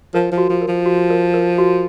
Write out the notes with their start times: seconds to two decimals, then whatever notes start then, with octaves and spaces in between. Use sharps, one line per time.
0.14 F3 A#4
0.32 F3
0.38 F#4
0.49 F3
0.62 A#4
0.68 F3
0.86 F#4
1.10 A#4
1.34 A#4
1.58 F#4